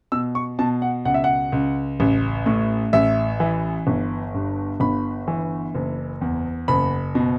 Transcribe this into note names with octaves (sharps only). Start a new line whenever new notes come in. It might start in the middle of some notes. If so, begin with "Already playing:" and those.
B2 E6
C#6
B2 A5
F#5
C#2 F#5
E5
F#5
C#2
A1
A2
A1 E5
E3
G1
G2
G1 B5
E3
F#1
E2
F#1 B5
B2